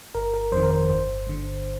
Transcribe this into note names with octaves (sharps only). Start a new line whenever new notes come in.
G1 A#4
A#4
F2 D#3 C5
A#4
C5
G1 C5
G2 D3